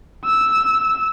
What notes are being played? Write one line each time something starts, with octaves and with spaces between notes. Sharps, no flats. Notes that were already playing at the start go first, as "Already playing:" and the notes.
E6